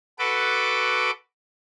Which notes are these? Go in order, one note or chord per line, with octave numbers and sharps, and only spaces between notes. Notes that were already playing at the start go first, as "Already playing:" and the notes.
F#4 A4 B4 D6